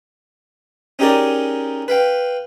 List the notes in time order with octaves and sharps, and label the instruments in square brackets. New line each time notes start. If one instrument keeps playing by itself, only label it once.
[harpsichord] C#4 D#4 G4 G#4 A#4 D5
B4 F5 G5